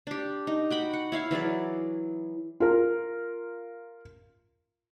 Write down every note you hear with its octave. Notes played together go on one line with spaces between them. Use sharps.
D4 G4
D#4
F#4 G5 B5
F#5
E4 C#5 F5
E3 F#3 G#4 D5
F4 A#4